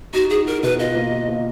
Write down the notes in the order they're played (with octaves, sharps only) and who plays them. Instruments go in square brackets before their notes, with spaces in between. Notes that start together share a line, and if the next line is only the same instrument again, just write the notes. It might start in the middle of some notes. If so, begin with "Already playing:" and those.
[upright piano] D#4 [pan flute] F#4
[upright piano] F#4 [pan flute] G#4
[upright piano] F#4 [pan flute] A#4
[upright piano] B2 [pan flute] B4
[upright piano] F4 [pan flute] D#5
[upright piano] A#3
A#3
A#3